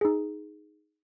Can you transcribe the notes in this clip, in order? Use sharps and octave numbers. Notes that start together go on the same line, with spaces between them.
D#4 G#4